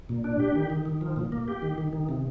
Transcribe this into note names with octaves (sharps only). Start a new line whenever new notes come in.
A#2
D4
G4
D#3
D#3
D#3
F3
A#2
A#3
G4
D#3
D#3
D#3
C3